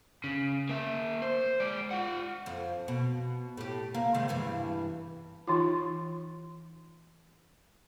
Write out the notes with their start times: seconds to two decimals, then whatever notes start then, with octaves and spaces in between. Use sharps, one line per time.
0.24 C#3
0.69 A#3 E5
1.22 C5
1.60 G#3 D5
1.91 F4 F#5
2.46 F2
2.88 B2
3.57 A2 G4
3.95 A#3
4.14 C3 D#3 G#3
4.28 E2 G2 E3
5.47 E3 D#4 F4